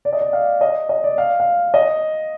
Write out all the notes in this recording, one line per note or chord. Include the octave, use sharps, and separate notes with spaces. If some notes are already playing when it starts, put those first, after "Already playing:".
D5
D#5
D5
F5
D#5
D#5
D5
F5
F5
D#5